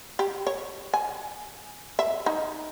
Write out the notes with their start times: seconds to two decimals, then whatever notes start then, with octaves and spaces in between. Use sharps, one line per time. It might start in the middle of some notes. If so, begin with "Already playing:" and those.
0.19 G4
0.47 C#5
0.94 G#5
1.99 E5
2.26 D#4